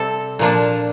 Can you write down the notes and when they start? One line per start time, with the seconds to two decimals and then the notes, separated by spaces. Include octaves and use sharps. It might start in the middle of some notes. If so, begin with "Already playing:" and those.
Already playing: C3 G3 C4 A4
0.39 A#2 F3 A#3 D4